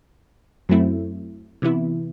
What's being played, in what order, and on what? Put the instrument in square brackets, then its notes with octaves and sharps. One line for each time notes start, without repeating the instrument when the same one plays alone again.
[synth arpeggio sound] F#2 F#3 A3 C4 E4
C3 E3 B3 E4